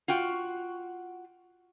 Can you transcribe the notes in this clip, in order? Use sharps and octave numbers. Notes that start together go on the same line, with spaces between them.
F4 F#4 G5